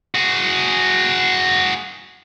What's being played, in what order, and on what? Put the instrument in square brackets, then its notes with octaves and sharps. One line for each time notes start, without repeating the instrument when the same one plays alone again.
[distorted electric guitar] F#4 G#4